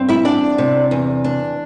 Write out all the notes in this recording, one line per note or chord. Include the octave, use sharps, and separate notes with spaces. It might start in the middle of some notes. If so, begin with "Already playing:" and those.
Already playing: G2 C4
E4 E5
E2 D4 D5
C3
E2
D4